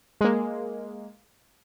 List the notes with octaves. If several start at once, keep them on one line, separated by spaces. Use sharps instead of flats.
G#3 A#3